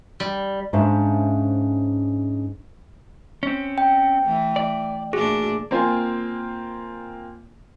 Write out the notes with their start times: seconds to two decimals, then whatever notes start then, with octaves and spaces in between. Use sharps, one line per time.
0.20 G3
0.73 G#2 C#4 D4 C5 E5 F5
3.43 C4 C#4
3.78 G5
4.23 E3 A3
4.56 D5
5.13 A#2 A3 D4 F#4 G#4
5.71 A#3 C4 F4 G#5